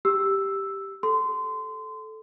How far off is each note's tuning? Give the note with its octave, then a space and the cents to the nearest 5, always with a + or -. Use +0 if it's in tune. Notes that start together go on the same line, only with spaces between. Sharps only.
G4 +0 E6 +0
A4 -10 C6 -25